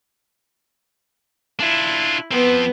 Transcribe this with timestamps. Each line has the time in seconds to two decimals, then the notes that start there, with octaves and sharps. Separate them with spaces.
1.60 D4 E4 F4
2.31 F3 B3 C4